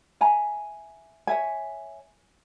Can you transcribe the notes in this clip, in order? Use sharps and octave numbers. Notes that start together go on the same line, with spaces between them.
E5 G#5 A#5
C#5 E5 G#5